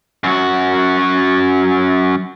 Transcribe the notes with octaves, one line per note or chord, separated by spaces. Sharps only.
F#2 F#4